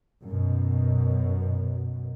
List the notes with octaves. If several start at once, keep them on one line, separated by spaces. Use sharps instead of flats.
F#2 B2